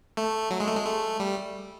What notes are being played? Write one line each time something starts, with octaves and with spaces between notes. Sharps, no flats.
A3
F#3
G#3
A3
G#3
A3
G3